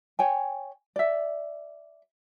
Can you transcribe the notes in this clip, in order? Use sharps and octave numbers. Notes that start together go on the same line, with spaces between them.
C#5 G5 G#5
D5 E5